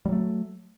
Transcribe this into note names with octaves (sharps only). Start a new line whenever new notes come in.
F#3 G3 A3